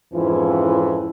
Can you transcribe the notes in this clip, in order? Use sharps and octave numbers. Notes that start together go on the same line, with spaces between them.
F2 G#2 E3 F3 C#4 E4